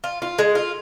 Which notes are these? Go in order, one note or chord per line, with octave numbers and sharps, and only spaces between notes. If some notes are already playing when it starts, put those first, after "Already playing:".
F4
F4
G#3
F4